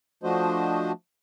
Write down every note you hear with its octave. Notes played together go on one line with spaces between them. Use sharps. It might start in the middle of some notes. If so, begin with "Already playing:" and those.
F3 A3 D4 F#4 C5 D#5